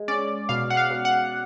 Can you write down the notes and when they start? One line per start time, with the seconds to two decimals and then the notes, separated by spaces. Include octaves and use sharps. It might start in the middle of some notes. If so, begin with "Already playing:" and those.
Already playing: G#3
0.08 C#4 D5
0.49 B2 F5
0.70 F#5
0.77 F5
0.91 B2
1.05 F#5